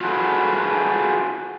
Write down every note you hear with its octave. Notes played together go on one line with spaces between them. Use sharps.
F4 F#4 G#4 A4 B4